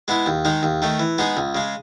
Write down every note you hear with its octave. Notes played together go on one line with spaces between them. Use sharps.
G#3 B3 E4
D#2
D#3 G#3 D#4
D#2
D#3 A3 D#4
E3
G#3 B3 D#4 G#4
C#2
C#3 G#3